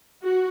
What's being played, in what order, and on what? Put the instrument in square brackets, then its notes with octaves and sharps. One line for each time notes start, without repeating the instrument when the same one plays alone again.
[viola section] F#4